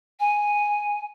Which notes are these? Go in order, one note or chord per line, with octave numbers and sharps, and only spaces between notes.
G#5